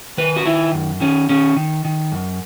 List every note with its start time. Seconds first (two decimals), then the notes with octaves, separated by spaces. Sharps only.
0.18 D#3 B4
0.36 F#4
0.45 D#3 E4
0.74 F#2
1.01 D#3 C#4
1.29 D#3 C#4
1.56 D#3
1.85 D#3
2.12 F#2